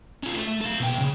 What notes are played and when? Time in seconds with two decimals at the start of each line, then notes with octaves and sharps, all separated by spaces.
0.23 C#4 F4
0.35 A3
0.48 A3
0.61 A4 F5
0.80 B2 G5
0.99 C#3